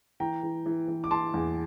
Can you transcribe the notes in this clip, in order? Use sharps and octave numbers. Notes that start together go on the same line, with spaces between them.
E3 G5 A#5
E3
E3
E3
D6
E3 A5 C6
E2